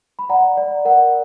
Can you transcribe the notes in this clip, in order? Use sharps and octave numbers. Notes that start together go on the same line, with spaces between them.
B5
D5 F#5 A#5
D5
A#4 F#5